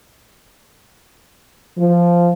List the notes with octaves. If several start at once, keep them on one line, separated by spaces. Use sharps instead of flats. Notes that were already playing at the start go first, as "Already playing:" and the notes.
F3